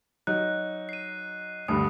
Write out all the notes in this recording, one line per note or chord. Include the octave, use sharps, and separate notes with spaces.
F#3 D#4 F#6
C7 D#7
D2 G2 D3 D#6